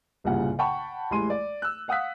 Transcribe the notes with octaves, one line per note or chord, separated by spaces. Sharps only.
F#1 C2 G2 A#2 C#3 F#5
F#5 G5 A5 B5 C#6
A1 G3 G#3 E4 C6 D#7
D5
E6 F#6
F5 F#5 D#6 E6 F#6 B6